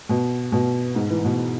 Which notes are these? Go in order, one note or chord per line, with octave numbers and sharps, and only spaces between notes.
B2
B2
G#2
E3
B2